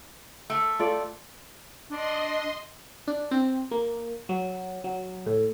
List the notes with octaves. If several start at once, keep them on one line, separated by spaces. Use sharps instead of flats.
A3
F4 A4 D5
D4 D#5 C6
D4
C4
A#3
F#3
F#3
A2